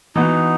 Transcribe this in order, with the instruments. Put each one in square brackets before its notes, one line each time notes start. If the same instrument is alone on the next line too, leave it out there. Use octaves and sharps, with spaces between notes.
[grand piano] E3 B3 F#4 [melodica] D#4